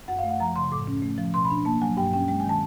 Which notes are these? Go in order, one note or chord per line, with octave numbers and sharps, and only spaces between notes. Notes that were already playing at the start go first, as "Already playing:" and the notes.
F#2 F#5
F5
A3
F#5
F3 A#5
C#3 C6
A2 D6
C#4
A3
F3
B2 C6
B5
D4
A#3 A5
F#3 G#5
G2 G5
C#4 G5
G#3 G5
G#5
D#3
A5